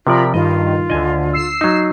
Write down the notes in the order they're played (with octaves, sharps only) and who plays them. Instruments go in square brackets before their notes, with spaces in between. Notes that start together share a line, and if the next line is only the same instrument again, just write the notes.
[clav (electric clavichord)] C3 F3 D5 [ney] F4 [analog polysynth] A#4 B5
[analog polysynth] G2 D#3 [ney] F4 [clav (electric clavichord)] D#5
[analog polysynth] D2 D3 [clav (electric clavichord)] D#5 G#5
[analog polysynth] E6 C7
[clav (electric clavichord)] F#3 D#4